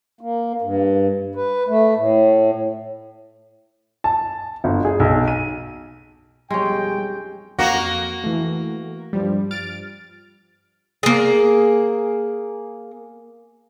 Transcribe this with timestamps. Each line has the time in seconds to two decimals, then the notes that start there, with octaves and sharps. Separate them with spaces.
0.21 A#3
0.62 G2
1.35 B4
1.68 A3
1.97 A2
4.04 A5
4.64 G1
4.85 G#4
5.00 B1
5.28 D#7
6.51 B1 F2 G3 G#3 C#4 G4 G5
7.59 F2 A#3 F#4
8.24 E3 A3
9.13 G2 F3 G3
9.51 F6 A6 D7
11.03 A#3 G#4